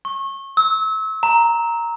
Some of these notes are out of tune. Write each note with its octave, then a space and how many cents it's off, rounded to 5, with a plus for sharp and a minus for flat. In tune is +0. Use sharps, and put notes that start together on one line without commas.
C#6 -25
E6 -30
A#5 +0